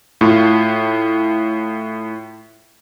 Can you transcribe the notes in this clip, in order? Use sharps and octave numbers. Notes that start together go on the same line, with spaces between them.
A2 F4